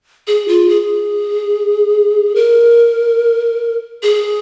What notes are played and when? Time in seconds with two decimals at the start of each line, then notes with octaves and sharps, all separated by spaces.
0.27 G#4
0.48 F4
0.69 G#4
2.35 A#4
4.03 G#4